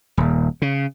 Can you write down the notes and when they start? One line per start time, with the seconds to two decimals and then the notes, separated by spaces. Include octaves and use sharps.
0.17 D#1
0.62 C#3